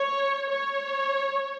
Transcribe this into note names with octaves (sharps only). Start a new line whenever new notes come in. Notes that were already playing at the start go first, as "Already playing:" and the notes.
Already playing: C#5
C#5